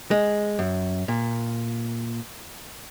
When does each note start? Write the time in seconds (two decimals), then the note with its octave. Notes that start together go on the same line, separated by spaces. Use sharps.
0.11 G#3
0.59 F#2
1.08 A#2